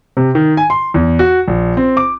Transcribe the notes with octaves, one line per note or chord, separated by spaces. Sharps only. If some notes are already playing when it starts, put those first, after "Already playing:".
C3
D#3
G#5
C6
E2
F#4
A#1
C4
D6